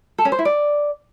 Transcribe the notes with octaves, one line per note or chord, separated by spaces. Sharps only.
A4
C#4
C5
E4
D5